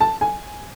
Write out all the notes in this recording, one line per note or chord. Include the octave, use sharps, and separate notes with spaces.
A5
G#5